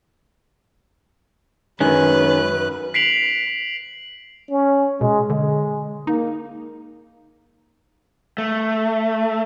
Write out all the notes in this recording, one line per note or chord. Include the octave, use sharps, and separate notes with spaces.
F#2 D#3 G#3 C#4 B4 F#6
B6 C7 D7 F7 F#7
C#4
B2 G#3
D3 G#3
A#3 D#4
A3